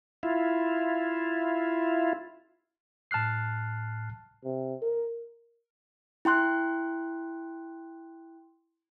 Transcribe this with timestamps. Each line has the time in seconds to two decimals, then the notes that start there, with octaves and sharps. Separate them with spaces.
0.23 E4 F4
3.11 A2 A5 F6 F#6 C7
4.44 C3
4.82 A#4
6.25 E4 G5 C6 F#6